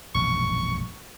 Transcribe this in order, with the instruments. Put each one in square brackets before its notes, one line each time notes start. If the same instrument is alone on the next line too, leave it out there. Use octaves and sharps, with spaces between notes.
[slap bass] E1 A#1 F#2 [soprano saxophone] C#6